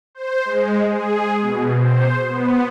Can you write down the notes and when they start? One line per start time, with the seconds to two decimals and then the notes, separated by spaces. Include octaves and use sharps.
0.15 C5
0.45 G#3
0.90 G#4
1.42 B2
1.77 C5
2.29 B3